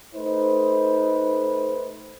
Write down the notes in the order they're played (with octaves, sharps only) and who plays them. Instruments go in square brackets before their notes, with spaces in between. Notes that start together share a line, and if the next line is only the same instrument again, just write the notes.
[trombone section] A3 D#4 B4 C5